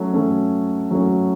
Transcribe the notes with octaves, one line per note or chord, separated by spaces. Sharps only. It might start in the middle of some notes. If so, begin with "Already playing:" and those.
Already playing: F#3 A3 C#4
F#3 A3 C#4
F#3 A3 C#4